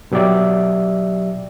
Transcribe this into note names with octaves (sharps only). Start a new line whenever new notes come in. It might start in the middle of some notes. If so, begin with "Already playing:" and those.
B2 F#3 G4 D5 E5